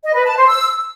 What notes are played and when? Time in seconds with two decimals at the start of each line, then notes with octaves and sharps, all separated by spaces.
0.04 D#5
0.15 B4
0.26 A5
0.37 C5
0.48 E6